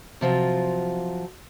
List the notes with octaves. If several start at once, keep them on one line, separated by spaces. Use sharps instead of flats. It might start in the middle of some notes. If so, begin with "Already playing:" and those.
C3 F3 F#3 F4